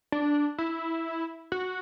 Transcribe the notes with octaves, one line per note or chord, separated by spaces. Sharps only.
D4
E4
F#4